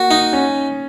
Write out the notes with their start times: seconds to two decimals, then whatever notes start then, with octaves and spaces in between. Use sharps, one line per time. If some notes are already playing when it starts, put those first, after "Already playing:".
Already playing: A#3 F#4
0.11 D#4
0.33 C#4